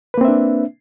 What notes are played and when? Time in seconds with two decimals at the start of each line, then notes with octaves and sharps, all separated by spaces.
0.14 B4
0.18 A#3
0.21 C4
0.25 E5
0.28 D4